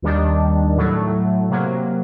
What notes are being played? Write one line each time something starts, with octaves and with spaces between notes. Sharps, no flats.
D#2 D#3 G3 D4
A2 F#3 A3
C3 F#3 A#3